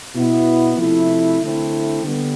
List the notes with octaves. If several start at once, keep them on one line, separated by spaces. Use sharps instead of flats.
B2 B3 E4
C3 F3 A3 E4
D3 A3 C4 E4
D3 G3 B3